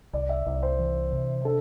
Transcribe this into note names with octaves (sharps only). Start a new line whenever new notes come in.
C2 D5
E5
C2 D5
C5
E3
C3
D4 A4